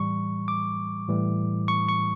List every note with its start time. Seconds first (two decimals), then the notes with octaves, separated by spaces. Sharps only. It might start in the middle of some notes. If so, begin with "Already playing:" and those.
Already playing: A2 E3 G3 C#6
0.48 D6
1.08 A2 E3 G3
1.68 C#6
1.88 C#6